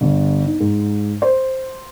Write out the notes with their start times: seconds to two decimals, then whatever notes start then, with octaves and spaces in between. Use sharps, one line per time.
0.01 G1
0.45 D#4
0.60 G#2
1.22 C5